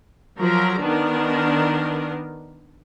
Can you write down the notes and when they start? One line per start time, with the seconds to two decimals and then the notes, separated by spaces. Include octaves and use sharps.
0.40 F3 F#3 A#4 A#5
0.82 D#3 B3 D4 A#4